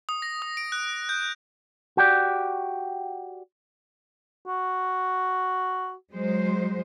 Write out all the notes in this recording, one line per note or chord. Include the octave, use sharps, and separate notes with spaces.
D#6
A#6
D#6
D7
F#6
G6
F#4 G4 D5
F#4
F#3 G#3 C5